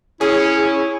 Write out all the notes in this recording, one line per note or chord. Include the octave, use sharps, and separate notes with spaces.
C#4 E4 G#4